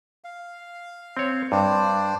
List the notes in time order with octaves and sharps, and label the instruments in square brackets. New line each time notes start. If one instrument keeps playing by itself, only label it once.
[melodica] F5
[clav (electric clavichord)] C4 C#5
[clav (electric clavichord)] G2 [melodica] D4 C5 D5